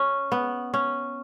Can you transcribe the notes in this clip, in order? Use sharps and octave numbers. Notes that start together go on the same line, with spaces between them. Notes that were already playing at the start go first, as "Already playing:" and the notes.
Already playing: C#4
B3
C#4